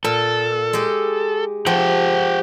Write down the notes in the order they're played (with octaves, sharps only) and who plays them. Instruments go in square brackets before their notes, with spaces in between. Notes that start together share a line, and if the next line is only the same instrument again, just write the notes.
[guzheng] A#2 [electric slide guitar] A4
[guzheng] G#3 G4
[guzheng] F3 [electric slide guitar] G4 F#5 G5